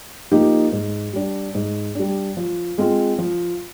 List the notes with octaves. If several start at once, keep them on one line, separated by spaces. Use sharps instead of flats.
F3 A#3 D#4 G4
G#2
G3 D4
G#2
G3 D4
F3
G#3 C4 F4
F3